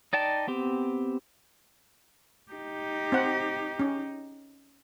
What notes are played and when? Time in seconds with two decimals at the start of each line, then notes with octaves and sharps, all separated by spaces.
0.13 D#4 D5 G5 A5
0.47 B3 C4 G4
2.51 D#4 G4
3.12 C4 F#5
3.80 C#4